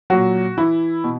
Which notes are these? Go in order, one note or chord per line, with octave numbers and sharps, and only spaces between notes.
A#2 F#3 F#4
E3 E4
B2